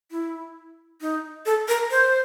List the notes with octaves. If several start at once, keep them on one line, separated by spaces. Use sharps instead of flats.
E4
D#4
A4
A#4
C5